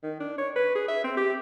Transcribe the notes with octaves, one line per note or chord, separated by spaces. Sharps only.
D#3
D4
C#5
B4
G#4
E5
C4
G4